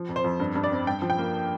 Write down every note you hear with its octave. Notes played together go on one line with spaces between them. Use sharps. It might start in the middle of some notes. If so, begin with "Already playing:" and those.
Already playing: F3
F2
C5
F2
G2
G2
D5
C4
G2 G5
F3
G5
A#3